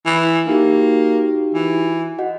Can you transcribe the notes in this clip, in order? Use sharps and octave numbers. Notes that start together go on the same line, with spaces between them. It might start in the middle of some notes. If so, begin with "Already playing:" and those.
E3
A#3 D#4 F#4 G4
E3
F#4 D#5 F#5